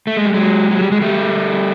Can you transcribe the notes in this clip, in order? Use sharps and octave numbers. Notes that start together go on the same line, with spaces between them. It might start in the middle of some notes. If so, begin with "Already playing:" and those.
A3
G#3
G3
F#3 G#3
F#3
G3
G#3
G3 A3